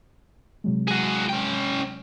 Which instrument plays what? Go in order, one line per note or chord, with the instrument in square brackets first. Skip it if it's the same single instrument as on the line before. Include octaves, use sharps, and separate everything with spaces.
[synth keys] C3 F#3 G#3
[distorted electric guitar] F#4 G#4
C#4 G5